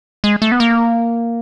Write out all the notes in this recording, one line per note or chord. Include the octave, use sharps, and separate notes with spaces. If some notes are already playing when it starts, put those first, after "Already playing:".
G#3
A3
B3
A#3